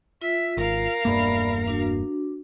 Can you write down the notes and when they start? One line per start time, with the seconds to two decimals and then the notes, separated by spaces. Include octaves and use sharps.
0.22 F4 E5
0.57 G#1 A#4 F5
1.05 E1 G2 A#3 D5 E5 B5
1.68 D4 F#4